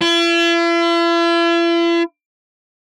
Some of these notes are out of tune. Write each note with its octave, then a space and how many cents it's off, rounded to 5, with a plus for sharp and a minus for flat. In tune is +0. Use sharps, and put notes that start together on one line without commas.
E4 +45